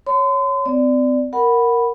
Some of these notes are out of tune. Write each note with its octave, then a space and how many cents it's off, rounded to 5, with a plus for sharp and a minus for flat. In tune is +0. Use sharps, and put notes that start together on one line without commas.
C#5 +0 C6 -40
C4 -35 D5 +0
A#4 +0 F#5 +0 B5 +0